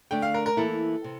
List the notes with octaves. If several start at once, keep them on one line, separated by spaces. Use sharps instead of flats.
D3 A3 D4 G5
F5
A#4
A#4
E3 A#3 E4 A4
C3